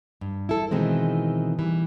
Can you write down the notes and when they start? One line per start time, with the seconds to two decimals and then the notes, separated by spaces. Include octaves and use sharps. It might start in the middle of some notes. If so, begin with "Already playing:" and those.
0.21 G2
0.49 E4 A4
0.71 B2 D#3 E3 G#3 C4
1.59 E3 G3